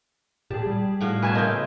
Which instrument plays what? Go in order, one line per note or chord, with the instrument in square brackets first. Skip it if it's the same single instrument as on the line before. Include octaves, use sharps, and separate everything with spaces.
[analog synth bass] A#2 [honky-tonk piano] G4 G#4 [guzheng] A5
[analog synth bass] G3
[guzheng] A2 F#4 F5
[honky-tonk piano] B2 G#5 G#6 [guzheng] B4 E5 A5
[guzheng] A#2 C#3 [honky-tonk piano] D#5 G6